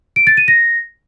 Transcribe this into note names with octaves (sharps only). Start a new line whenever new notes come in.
D7
A6
D#7
A#6